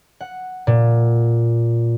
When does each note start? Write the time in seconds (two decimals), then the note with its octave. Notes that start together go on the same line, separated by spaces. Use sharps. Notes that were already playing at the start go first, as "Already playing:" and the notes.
0.21 F#5
0.67 A#2